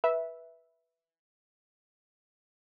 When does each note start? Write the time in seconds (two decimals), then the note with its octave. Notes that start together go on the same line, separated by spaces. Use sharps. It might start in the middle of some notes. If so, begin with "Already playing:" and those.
0.04 B4 E5